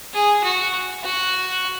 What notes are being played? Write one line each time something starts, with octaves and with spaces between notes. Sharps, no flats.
G#4
F#4
F#4